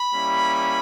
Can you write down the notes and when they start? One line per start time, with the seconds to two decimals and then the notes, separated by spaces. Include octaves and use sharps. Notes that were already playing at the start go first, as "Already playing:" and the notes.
Already playing: B5
0.13 G3 A#3 C#4 E4